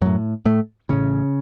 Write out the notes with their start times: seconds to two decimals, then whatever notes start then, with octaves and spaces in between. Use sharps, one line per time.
0.01 A1 F#2 A2 F#3
0.45 A2 A3
0.89 A1 A2 C#3 C#4